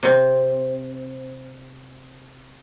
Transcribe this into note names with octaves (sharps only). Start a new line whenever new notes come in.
C3 C4